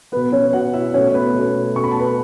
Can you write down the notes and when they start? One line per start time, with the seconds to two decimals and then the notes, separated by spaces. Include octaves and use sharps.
0.12 B2 B3 B4
0.32 C#4 C#5
0.53 B2 B3 F#4 F#5
0.74 E4 E5
0.94 B2 A3 C#4 C#5
1.14 B3 B4
1.35 B2 A3 C#4
1.75 B2 A3 C#4 C#6
1.84 B5
1.91 A5
2.00 B4 B5